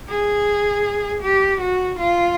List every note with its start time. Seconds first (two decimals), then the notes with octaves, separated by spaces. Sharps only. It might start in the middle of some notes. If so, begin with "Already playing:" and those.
0.09 G#4
1.23 G4
1.61 F#4
2.00 F4